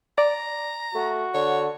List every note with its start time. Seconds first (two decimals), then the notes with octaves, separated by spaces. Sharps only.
0.18 D5 A#5
0.95 A3 F#4
1.34 D3 C#5